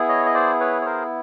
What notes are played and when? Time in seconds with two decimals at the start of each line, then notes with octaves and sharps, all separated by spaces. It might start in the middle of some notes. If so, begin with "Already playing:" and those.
Already playing: B3 E4 G#4
0.09 C#5 D#5
0.26 D#5
0.34 C5 D5
0.60 B4 C#5
0.81 C#5
0.85 A#4 C5